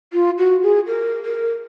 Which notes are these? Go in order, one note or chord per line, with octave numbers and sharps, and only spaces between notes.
F4
F#4
G#4
A#4
A#4